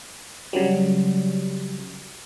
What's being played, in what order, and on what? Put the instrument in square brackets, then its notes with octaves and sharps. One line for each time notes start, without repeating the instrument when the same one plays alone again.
[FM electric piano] C#3 F#3 G3